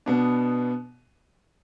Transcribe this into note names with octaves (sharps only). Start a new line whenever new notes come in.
B2 B3 D4